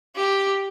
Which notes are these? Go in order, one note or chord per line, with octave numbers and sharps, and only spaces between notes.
G4